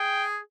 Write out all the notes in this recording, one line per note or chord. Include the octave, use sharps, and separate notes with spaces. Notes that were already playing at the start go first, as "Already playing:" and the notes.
Already playing: G#4 G5